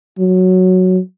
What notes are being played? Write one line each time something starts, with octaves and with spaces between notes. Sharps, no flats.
F#3